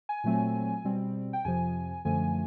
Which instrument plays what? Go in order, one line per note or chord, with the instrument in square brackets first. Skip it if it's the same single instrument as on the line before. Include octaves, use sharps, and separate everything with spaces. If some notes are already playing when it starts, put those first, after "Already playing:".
[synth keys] G#5
A#2 F#3 A3 C4
B2 G3 C4
G5
F2 C3 F3 G#5
F#2 D3 F3 A3 G#5